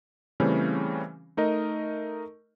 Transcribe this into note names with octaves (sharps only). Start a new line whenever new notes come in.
C#3 E3 G3 A3 C4 C#4
A3 D#4 A#4 D#5